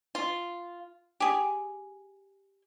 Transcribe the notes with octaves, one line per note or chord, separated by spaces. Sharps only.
F4
G4 G#4